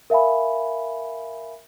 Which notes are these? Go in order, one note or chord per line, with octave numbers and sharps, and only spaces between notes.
A#4 E5 F5 G#5 B5